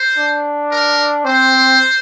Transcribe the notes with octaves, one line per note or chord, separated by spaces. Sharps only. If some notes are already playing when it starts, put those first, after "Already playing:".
Already playing: C5
D4
A#4
C4 C5